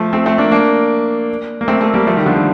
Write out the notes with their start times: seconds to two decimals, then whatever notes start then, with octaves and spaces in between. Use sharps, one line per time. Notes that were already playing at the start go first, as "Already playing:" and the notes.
Already playing: F3 A3
0.13 A3 C4
0.26 A3 C4
0.38 A#3 D4
0.52 A#3 D4
1.61 A#3
1.68 A3 C4
1.81 A3 C4
1.94 G3 A#3
2.07 F3 A3
2.16 D#3 G3
2.26 D3 F3
2.36 D#3